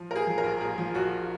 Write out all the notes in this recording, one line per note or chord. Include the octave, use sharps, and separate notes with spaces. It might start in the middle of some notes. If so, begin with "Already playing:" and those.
Already playing: F3
A#2 A#4
G#4
F3
A#4
A#1
A#2 G#4
F3
A#1 F#4